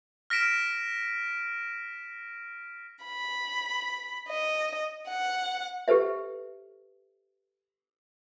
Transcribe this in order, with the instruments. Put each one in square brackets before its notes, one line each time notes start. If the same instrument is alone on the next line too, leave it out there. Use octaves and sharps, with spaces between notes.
[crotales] F6 A#6 B6 D7 E7
[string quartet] B5
D#5
F#5
[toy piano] G4 A4 B4 C5 E5